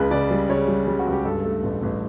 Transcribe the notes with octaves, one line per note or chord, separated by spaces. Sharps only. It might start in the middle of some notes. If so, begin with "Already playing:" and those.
Already playing: C#2 C#3 B4
C#3 D5
G3
C#3 C#5
G3
G3
F#4
C#2
G4
G2 A4
A3
A1
A1